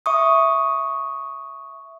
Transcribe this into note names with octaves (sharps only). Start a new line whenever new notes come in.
E5 C#6 D#6